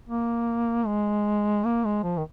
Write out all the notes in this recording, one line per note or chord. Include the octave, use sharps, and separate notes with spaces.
A#3
G#3
A#3
G#3
F3
D#3